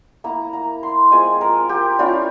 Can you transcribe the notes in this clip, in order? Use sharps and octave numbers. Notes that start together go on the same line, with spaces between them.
A#3 E4 A#5
A#5
C6
G#3 C4 F4 G#5
A#4
G4
G3 C#4 E4 F4